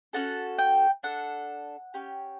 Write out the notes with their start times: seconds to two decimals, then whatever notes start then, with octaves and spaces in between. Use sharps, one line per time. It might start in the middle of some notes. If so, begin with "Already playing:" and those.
0.13 C#4 F#4 A4 A5
0.58 G5
1.03 D4 A4 F#5
1.94 C#4 G4